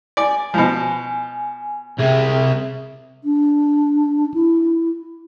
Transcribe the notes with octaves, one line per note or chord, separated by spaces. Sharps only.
D5 G#5
B2 F3
C2 C3 G#4 E5
D4
E4